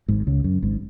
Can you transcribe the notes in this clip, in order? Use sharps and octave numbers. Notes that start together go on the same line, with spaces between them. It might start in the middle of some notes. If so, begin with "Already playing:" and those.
G#1 G#2
C#2 C#3
F#2
G#1 G#2